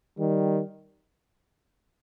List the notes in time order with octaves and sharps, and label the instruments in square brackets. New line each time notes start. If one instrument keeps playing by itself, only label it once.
[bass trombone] D#3 [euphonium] G3